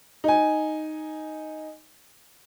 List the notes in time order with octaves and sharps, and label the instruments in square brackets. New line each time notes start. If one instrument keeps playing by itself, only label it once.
[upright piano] D#4 G#5